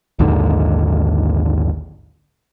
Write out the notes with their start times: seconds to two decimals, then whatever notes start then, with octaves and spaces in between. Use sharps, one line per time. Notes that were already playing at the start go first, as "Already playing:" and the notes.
0.19 A#1 D#2 G#2 D3